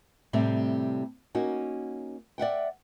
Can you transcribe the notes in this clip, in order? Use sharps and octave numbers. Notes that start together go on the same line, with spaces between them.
A2 C3 G3 A3 C4
A#3 C#4 D#4 F#4
D5 E5 F#5 G5